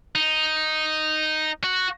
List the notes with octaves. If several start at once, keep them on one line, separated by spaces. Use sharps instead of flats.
D#4
F#4